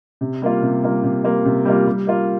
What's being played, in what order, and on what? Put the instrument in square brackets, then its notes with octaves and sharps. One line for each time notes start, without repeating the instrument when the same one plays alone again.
[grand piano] C3
G3 A#3 F4
C3
G3 A#3 F4
C3
G3 A#3 F4
C3
G3 A#3 F4
G3
A#3 F4